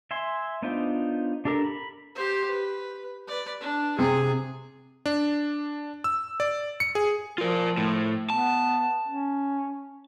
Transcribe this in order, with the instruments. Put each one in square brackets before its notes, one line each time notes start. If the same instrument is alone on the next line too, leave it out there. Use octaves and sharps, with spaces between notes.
[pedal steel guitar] E5 G#5 C6
B3 D4 D#4 F4 C5
D4 G4 A4 A#4
B5
[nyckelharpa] G4 C5
B4
B4 D5
D4
[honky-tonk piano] C3 [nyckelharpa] G#4
[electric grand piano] D4
E6
D5
C#7
G#4
[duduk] F3 [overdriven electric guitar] F4 A#4
[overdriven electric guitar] A2
[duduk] B3 [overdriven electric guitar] A5
[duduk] C#4